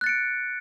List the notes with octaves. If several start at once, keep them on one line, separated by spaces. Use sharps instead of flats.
F#6 A6 C#7 D7